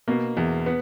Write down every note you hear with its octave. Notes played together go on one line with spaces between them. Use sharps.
B2 A#3
E2
B3